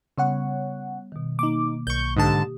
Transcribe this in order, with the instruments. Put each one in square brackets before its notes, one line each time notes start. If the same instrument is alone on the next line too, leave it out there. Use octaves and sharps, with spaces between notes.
[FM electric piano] C#3 C#5 F#5 [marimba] G3 B3
[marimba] B2 D#3
[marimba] A#3 [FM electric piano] D#4 D6
[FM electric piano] B1 [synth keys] C#6 G6
[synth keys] G#2 D3 A5 [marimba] G4 D#6